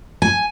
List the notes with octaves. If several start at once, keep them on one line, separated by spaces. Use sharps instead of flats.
G#5